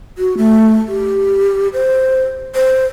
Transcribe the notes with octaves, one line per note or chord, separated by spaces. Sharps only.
F#4
A3
G4
C5
C5